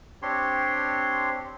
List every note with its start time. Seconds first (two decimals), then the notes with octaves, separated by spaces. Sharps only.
0.22 C4 D4 G4 C#5 C6